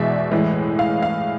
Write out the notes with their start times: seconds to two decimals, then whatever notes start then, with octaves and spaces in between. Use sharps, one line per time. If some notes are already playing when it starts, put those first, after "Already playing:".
Already playing: E2 B2 G#3 D5 E5
0.31 A2 E3 G#3
0.79 F5
1.02 F5